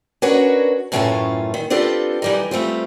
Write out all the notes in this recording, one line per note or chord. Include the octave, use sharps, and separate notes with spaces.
C#4 D4 F#4 A#4 B4 C#5
F#2 A2 E3 A3 C#4 F4
D#3
C4 D4 F4 G4 A4 B4
E3 G3 D#4
G3 A3 C4 F4